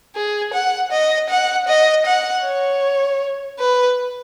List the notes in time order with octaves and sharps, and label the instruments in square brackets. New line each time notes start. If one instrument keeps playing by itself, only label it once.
[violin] G#4
F#5
D#5
F#5
D#5
F#5
C#5
B4